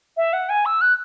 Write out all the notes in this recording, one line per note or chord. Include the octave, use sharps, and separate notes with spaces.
E5
F#5
G#5
E6
F#6